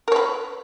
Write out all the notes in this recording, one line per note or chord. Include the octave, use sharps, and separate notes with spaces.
A#4 B4 C#5